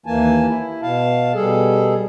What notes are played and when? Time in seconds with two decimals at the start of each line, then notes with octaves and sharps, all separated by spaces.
0.06 D#2 E3 A#3 G#5 A5
0.47 E4
0.82 B2 F5 A5
1.34 B2 G3 G#4 A4